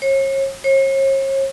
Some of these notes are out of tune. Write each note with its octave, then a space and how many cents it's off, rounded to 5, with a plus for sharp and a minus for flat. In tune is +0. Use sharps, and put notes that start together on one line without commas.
C#5 -40
C#5 -45